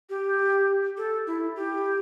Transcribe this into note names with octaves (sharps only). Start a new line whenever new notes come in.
G4
A4
E4
G4